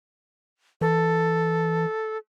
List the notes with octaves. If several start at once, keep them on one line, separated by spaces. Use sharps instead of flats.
E3 A4